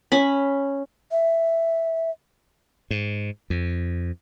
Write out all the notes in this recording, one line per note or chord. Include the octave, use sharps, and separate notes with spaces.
C#4 B5
E5
G#2
F2